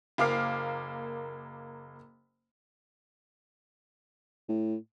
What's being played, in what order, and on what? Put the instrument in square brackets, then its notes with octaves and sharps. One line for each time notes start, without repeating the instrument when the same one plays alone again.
[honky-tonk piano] F#1 A#3 F5 D6 F6 C7
[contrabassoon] A2